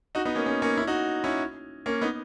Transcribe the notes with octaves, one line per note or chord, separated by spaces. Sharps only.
D#4 F#4
B3 D#4
A#3 C#4
A#3 C#4
A#3 C#4
C#4 E4
D#4 F#4
C#4 E4
A#3 C#4
B3 D#4